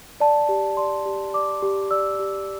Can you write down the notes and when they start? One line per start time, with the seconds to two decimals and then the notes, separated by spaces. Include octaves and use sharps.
0.20 D5 A5
0.49 G4
0.77 D5 C6
1.06 G4
1.34 D5 D6
1.62 G4
1.91 D5 E6
2.19 G4